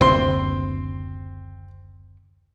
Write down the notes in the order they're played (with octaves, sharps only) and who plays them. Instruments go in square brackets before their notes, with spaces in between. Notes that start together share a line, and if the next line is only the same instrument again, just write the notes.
[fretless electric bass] F#1 D2 C3 [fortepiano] C4 C6